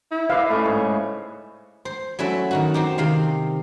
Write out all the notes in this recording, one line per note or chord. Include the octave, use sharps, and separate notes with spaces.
E4
B4 D5 D#5 F5
A2 C#3 A3 C#6
G#2 C#5
C5
F#3 A3 C#4 E4 E5
D#3 D#4 F#4
C4 D#4 G4
C3 D#3 F5 C6